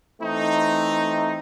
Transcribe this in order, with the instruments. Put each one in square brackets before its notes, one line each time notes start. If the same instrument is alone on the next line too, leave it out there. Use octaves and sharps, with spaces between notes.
[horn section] E3 A3 C4 D#4